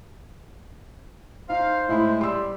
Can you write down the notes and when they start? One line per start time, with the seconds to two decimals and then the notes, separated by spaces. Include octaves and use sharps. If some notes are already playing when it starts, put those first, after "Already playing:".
1.50 D#4 C5 F5
1.89 A2 G#3 E4
2.21 G3 C6 E6